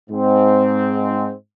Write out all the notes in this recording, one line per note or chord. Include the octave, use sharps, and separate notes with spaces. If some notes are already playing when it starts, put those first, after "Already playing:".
G#2 C4